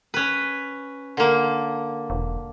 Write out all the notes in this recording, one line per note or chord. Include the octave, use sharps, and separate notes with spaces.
C#4 B4
D3 A#3
E1